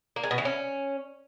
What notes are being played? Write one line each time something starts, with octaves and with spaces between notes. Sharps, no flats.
A#3
G#3
B2
E3
C#4